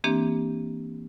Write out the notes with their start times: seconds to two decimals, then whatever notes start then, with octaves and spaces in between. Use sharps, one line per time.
0.04 E3 A#3 C4 D4 G4